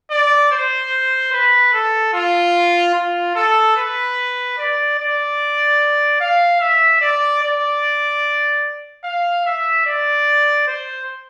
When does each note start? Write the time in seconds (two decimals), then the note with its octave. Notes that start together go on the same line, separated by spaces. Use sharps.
0.11 D5
0.51 C5
1.33 B4
1.73 A4
2.14 F4
2.95 F4
3.35 A4
3.76 B4
4.58 D5
4.98 D5
6.21 F5
6.61 E5
7.01 D5
7.42 D5
9.04 F5
9.45 E5
9.86 D5
10.67 C5